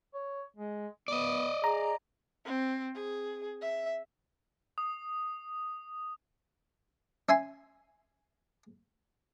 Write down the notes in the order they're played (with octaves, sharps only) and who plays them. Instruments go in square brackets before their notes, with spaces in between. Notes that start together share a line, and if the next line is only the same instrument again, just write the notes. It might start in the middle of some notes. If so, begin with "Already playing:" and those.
[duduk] C#5
G#3
[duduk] B3 [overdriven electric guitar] D5 D#5
[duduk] G#4 [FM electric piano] A#5
[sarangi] C4
G#4
E5
[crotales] D#6
[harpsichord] C#4 E5 G#5 C6